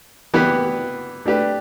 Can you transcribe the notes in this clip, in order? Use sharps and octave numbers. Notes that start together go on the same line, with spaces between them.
E3 B3 G4 B4
A3 D4 G4 B4